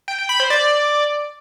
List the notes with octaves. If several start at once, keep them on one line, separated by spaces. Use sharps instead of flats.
G5
G5
B5
C5
D5